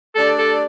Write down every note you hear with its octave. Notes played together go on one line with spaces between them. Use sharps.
A3 D4 G4 A4 D5
A4